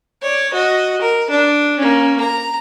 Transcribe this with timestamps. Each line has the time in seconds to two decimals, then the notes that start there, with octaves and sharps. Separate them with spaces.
0.22 C#5 D5
0.53 F#4 D#5
1.01 A#4
1.30 D4
1.79 A#3 C#4
2.20 A#5